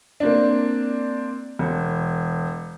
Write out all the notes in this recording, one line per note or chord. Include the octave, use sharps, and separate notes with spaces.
A#3 C4 D4
E1